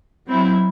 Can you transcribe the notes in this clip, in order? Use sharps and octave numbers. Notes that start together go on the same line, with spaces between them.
F#3 C4 E4